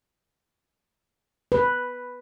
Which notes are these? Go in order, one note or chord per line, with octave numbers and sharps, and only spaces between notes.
B4